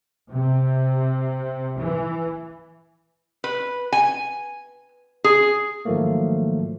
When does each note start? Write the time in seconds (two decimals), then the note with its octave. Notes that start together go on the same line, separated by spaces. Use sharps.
0.32 C3
1.79 E3
3.44 B4
3.92 G#5
5.24 G#4
5.85 G#2 D#3 F3 F#3 A3 A#3